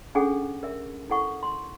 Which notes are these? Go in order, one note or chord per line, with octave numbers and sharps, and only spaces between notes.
C#4 D4 G#4 A4 F#5
A#4 E5
E4 A4 F#5 C#6
C6